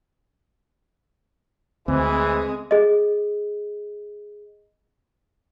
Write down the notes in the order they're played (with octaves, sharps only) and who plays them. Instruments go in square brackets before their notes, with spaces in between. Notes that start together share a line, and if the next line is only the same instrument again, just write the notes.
[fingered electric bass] D2 [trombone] E3 [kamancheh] G#3 G#4 [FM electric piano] C4
[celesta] G#4 D#5